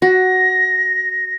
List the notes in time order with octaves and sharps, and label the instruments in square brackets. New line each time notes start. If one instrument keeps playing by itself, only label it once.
[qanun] F#4 [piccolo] A#6